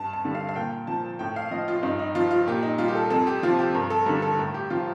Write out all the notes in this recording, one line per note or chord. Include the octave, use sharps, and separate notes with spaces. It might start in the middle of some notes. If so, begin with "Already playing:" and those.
Already playing: G2 A5
A5
D3 G3
F5
F5
A#2 G5
F3 A5
A2 G5
F5
F3 D#5
F4
G2 D#4
D#4
F3 F4
F4
A#2 G4
D#4
G3 F4
G4
A4
F2 A4
G4
C3 F3 F4
G4
G2 A#4
A4
D3 G3 A#4
A4
A2 A#4
G4
F3 F4